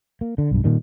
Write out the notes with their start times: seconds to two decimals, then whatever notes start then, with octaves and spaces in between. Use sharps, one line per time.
0.21 A#3
0.38 D3
0.51 B1 G2
0.64 A#2 D#3 G3